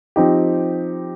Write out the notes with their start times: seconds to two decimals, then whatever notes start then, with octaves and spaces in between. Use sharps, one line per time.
0.16 F3 C4 D#4 G4